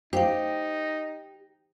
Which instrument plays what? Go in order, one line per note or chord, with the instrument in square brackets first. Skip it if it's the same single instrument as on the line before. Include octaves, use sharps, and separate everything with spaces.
[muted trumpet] D#4 [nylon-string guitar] G4 [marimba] C5 F5 G5